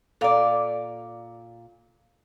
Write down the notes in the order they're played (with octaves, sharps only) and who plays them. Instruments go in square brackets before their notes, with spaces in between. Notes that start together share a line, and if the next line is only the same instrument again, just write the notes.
[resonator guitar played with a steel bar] A#2 D5 [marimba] A4 F5 A#5